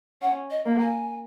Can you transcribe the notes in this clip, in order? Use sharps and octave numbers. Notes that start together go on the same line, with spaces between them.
C#4 F#5
D#5
A#3
G#5